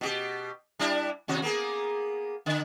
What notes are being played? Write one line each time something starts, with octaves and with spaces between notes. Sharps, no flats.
B2 F#4 G4
G3 D4 E4
D#2 C3 F#4
A#3 B3 G#4
D3